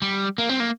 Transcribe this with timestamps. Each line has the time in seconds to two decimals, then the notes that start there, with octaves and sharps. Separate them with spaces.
0.02 G3
0.38 A#3
0.49 C4
0.60 A#3